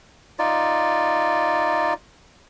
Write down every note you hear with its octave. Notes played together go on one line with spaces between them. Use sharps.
D#4 F4 D5